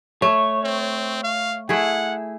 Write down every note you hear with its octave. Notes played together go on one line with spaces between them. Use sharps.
A3 C#5
C4
F5
A3 E4 G#4 F#5